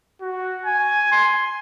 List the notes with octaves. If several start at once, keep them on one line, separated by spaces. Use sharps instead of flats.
F#4
G#5
C6